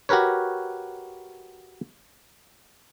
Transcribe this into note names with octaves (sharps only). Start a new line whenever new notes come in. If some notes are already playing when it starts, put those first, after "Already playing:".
F#4 G4 A#4 B4 C#5